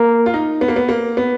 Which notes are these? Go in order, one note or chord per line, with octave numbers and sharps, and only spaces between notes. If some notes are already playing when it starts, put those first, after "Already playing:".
Already playing: A#3
F4
D#4
B3
A#3
B3
A#3
B3